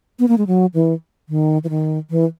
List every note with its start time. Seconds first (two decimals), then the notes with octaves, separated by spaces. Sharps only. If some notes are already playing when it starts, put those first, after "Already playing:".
0.19 B3
0.28 A#3
0.38 G#3
0.47 F#3
0.74 E3
1.29 D#3
1.64 E3
1.70 D#3
2.10 E3